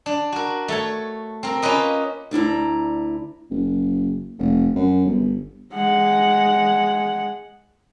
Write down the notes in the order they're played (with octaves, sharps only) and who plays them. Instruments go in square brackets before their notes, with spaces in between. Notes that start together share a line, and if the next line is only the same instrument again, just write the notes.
[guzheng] D4
F#4 A#4
A3 A4 C#5
C4 A#4
A#3 C#4 F4 B4 D#5
[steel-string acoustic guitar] D2 D4 E4 A#5
[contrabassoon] F#1
F1
F#2
G1
[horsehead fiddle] G#3 F#5